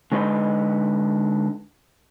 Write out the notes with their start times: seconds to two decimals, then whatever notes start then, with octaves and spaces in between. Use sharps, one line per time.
0.12 D3 G#3 D#4 B4 D#5